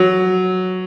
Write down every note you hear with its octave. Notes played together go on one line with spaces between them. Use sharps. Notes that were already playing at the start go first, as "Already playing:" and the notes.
Already playing: F#3